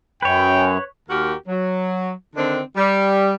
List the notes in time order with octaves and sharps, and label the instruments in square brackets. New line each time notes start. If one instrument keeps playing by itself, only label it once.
[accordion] F#2 [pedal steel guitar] B4 C#5 [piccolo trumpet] G5
[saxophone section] D#2 F#4 G4 A#4
F#3
D3 D#3 C4 D4
G3